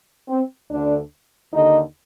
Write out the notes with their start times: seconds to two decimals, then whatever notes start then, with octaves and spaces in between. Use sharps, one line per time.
0.28 C4
0.70 D2 D3 D4
1.52 D#2 D3 D#4